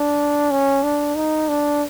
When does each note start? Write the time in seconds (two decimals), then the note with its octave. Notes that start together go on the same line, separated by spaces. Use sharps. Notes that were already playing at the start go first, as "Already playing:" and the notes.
Already playing: D4
0.51 C#4
0.83 D4
1.15 D#4
1.49 D4